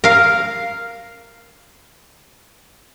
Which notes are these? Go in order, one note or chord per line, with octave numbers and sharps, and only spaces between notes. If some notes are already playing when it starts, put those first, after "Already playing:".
A#4 F5